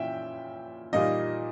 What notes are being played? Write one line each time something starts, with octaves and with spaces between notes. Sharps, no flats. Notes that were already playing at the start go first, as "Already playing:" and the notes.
Already playing: A#2 C#4 E4 E5 G5
A#2 G3 A#3 D#4 D#5